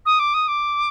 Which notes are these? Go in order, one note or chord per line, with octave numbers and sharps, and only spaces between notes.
D#6
D6
D#6
D6